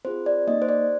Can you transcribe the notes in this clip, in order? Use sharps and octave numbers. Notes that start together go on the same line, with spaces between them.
C4 F4 G#4 C5
D5
A#3 D#4 G4 D#5
C5
D5